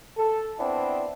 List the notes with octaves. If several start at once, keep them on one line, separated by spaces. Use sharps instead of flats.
A4
B3 C4 D4 E4